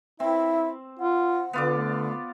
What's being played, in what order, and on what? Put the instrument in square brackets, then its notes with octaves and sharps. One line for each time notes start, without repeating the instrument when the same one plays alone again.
[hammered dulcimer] C4 [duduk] E4 [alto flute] E5
[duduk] F4 [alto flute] F#5
[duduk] D3 [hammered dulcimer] B3 F4 D5
[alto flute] A3